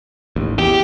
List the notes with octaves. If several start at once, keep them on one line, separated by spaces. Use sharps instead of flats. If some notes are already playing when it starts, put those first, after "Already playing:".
A1 D#2
E2 G4